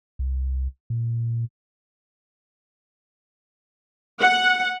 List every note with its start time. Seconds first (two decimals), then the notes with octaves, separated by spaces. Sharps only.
0.19 C2
0.90 A#2
4.22 F#5